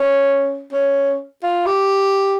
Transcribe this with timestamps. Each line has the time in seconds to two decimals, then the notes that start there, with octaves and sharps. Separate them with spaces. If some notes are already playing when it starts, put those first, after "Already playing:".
Already playing: C#4
0.72 C#4
1.43 F4
1.66 G4